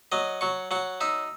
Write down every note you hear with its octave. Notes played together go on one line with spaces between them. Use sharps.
F#3 D#5
F#3 C#6
F#3 F#5
D#4 E5